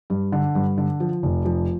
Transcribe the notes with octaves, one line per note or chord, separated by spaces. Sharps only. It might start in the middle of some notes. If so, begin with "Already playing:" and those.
G2
D3
G2
D3
F3
F1
F3